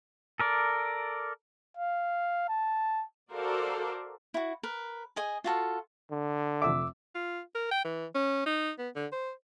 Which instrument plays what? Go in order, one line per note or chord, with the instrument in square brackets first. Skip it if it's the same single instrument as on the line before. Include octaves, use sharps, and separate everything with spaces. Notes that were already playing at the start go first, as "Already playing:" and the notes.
[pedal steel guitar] A4 A#4 D5
[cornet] F5
A5
[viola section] F#4 A4 A#4 C5 D5 F5
[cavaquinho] E4 F#4
A#4 B4
G#4 D#5 G#5
F4 F#4 A4 F5
[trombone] D3
[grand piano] F1 F2 E5 [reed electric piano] D6 E6
[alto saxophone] F4
A#4
G5
E3
C#4
D#4
B3
D3
C5